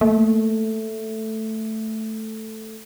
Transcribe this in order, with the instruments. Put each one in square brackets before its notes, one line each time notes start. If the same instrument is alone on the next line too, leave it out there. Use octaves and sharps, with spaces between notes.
[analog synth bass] A3 [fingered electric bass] A#3